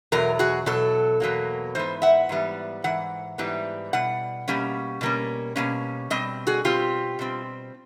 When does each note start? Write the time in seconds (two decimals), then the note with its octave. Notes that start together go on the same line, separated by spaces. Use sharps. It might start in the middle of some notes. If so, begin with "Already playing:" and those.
0.12 E2 B2 F#3 A#4
0.39 F#4 G#4
0.66 E2 B2 F#3 A4
1.20 E2 B2 F#3 A#3
1.75 G#2 E3 B3 C5
2.02 E5 F#5
2.29 G#2 E3 G3 B3
2.84 G#2 E3 F#5
3.38 G#2 E3 G3 B3
3.93 B2 G3 F#5
4.48 B2 G3 A#3 C#4
5.01 B2 G3 A#3 C#4
5.56 B2 G3 A#3 C#4
6.10 B2 G3 C4 D#5
6.47 F#4 G#4
6.65 B2 G3 C4 F4 G4
7.19 B2 G3 C4